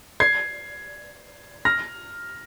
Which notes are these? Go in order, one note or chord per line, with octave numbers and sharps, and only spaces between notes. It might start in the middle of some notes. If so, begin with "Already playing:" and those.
G#6 C7
F6 A#6